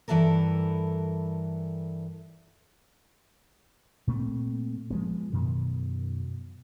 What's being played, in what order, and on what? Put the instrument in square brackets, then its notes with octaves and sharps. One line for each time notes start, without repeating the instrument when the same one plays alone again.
[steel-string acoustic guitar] G2 E3 E4 A4 A#4
[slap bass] A#2 A3 C4
F3 G#3 B3
F#2 B2 D#3